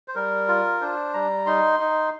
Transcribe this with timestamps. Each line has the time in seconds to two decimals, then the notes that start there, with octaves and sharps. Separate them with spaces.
0.08 C5
0.15 G3 A#4
0.48 F4
0.81 D4 C5
1.14 G3 A#5
1.46 D#4 C6
1.80 D#4